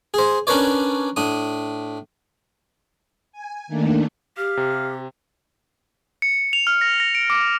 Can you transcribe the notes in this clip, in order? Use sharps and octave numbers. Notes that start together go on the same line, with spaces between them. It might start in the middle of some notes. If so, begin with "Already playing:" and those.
G#4 C5
C#4 D4 A#4 B4 C#5 D5
A2 D4 D#6
G#5
D#3 A3 A#3 D4
G4 F5
C3
C#7
F7
F6
A#6
A#6
D7
D6